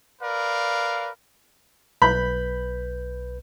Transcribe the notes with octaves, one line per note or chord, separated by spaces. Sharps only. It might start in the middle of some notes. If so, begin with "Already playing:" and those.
A#4 B4 D5 F5
B1 B4 B5 G6